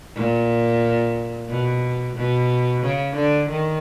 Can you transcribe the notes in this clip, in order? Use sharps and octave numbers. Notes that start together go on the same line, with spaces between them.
A#2
B2
B2
C#3
D3
D#3